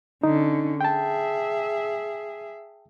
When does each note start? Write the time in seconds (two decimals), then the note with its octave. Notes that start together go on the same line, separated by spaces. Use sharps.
0.24 D3 C#4 D#4
0.81 G#4 E5 G5 A5